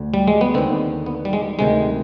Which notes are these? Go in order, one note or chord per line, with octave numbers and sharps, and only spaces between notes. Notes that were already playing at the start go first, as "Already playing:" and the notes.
Already playing: D2 D3
G3
G#3
B3
D#2 D3 C4
B3
G3
G#3
D2 C3 D#3 G#3